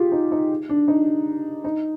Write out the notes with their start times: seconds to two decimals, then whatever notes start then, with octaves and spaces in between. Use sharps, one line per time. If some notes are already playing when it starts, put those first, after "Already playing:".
Already playing: F4 G4 G#4
0.12 D#4
0.31 D#4
0.69 D4
0.88 D#4
1.64 D#4